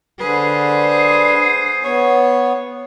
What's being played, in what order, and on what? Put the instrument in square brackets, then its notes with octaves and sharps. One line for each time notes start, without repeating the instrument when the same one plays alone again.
[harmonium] D3 [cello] G#4 C5 [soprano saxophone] B4
[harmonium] B3 [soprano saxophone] C#5